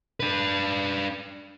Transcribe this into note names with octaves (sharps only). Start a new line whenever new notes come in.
D4 B4